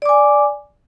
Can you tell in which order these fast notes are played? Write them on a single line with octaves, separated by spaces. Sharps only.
D5 D6 G#5